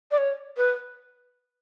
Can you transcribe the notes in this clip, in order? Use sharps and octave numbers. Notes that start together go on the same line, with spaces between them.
D5
C#5
B4